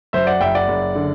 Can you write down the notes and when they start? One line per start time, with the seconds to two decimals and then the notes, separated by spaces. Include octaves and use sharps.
0.13 F#2 C5 E5
0.27 D5 F#5
0.41 F#1 E5 G5
0.55 D5 F#5
0.68 F#1
0.95 D3